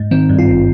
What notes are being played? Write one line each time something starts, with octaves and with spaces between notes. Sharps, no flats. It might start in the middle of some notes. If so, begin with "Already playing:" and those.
Already playing: G#2
D#3 C4
G2
F4
G#1